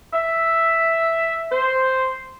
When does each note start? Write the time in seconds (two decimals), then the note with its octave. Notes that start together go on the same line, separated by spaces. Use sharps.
0.13 E5
1.52 C5